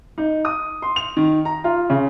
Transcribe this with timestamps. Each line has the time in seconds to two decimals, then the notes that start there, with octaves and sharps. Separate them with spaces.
0.18 D#4
0.45 D#6
0.82 C6
0.96 F7
1.17 D#3
1.45 A#5
1.64 F4
1.90 C#3